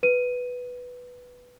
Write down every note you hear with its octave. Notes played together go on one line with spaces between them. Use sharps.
B4 D#7